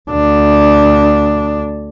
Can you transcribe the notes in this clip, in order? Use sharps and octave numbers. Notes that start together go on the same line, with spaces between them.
D2 D4